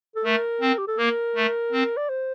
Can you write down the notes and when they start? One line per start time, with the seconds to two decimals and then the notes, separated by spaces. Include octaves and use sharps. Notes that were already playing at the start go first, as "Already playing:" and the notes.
0.16 A4
0.24 A3 A#4
0.61 C4
0.78 G4
0.88 A4
0.98 A#3 A#4
1.35 A3
1.72 C4
1.97 D5
2.09 C5